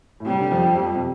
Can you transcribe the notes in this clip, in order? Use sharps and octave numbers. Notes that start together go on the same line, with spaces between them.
A2
C3 G3
D3
F2 F3
F2 F3
C3